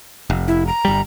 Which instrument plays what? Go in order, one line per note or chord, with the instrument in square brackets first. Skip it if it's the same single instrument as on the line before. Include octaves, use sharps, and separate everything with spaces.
[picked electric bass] F1
[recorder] E4
A#5
[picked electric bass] G1 G3